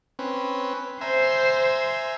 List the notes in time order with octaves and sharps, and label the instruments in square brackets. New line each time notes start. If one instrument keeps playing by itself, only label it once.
[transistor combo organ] C4 C#4 B4
[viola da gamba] C5 [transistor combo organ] E5 G#5 A#5